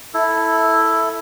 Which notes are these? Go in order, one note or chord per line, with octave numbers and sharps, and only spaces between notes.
E4 A4